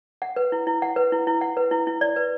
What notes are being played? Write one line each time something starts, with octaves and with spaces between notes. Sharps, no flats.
F#5
B4
E4
E4
F#5
B4
E4
E4
F#5
B4
E4
E4
D5
B4